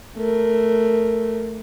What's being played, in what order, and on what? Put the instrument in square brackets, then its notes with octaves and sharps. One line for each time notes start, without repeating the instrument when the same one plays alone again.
[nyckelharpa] A3 A#4